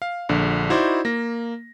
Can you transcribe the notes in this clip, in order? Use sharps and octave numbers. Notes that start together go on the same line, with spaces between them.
F5
A#1 D3
D#4 E4 F#4 C5 D5
A#3 A#6